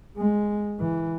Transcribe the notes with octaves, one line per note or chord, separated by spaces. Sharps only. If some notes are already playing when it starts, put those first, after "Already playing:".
G#3
E3